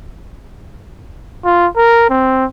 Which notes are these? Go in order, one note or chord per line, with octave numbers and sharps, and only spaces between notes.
F4
A#4
C4